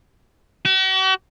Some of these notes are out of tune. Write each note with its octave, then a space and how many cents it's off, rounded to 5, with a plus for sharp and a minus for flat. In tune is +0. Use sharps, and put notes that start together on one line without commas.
F#4 +45